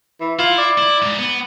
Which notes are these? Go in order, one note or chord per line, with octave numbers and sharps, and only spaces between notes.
E3
E4 F4
D5
E4
G#2
B3